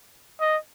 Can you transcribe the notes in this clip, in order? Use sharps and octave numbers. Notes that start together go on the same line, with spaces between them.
D#5